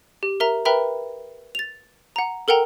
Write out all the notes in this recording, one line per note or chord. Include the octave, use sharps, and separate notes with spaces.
G4
A#4 E5 A#5
A#4 B4 E5 G5 A#5 B5
A6 F7
F#5 A#5
A4 A#4 F#5 G5 A#5